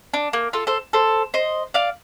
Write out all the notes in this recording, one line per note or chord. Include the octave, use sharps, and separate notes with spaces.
D4
A#3
F4 A4
A4 C5
A4 C5
C5 D#5
D5 F5